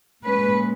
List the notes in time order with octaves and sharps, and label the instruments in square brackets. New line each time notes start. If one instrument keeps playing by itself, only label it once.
[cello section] A#2 G#3 C#4 B4